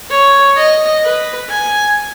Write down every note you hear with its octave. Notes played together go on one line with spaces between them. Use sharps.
C#5
D#5
B4
G#5